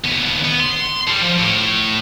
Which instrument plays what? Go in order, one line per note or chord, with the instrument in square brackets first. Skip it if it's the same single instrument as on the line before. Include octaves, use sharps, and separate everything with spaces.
[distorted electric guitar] D#2 B3
B3
C6
A2 G3
F3
A2